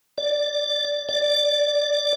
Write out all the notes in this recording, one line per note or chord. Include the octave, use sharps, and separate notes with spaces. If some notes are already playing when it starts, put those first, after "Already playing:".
D5
D5